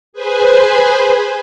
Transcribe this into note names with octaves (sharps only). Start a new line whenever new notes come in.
G#4 B4 C5 G#5